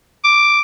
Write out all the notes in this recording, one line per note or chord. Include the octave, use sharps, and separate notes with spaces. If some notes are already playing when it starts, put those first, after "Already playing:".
D6